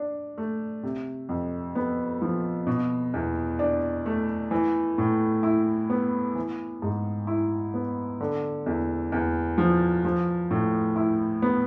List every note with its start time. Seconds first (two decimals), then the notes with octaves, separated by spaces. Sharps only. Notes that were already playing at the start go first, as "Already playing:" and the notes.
Already playing: D4
0.38 A3
0.83 C3
1.29 F2
1.75 B3
2.22 F3
2.67 B2
3.14 E2
3.59 D4
4.06 A3
4.51 E3
4.98 A2
5.43 E4
5.90 B3
6.35 E3
6.82 G#2
7.27 E4
7.74 B3
8.21 D3
8.66 E2
9.12 E2
9.58 F3
10.05 F3
10.51 A2
10.96 E4
11.42 B3